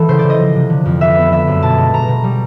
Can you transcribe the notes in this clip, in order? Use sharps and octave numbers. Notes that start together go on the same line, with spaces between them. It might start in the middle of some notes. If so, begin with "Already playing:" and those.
Already playing: E3 G#3 A4
C#3 C5
D5
C#3
D#5
F3
C3
D3
F2
B3 E5
B3
D3 E5
F#2
B2 A5
G#3
B2 A#5
B2
G3